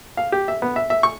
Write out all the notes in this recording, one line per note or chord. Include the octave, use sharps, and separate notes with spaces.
F5
G4
E5
B3
E5
E5
C#6